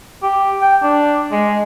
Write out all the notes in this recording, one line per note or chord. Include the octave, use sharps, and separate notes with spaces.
G4
G5
D4
G#3